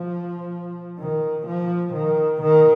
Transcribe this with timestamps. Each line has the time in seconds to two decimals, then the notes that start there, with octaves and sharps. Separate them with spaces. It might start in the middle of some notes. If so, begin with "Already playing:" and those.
Already playing: F3
0.99 D#3
1.47 F3
1.93 D#3
2.42 D#3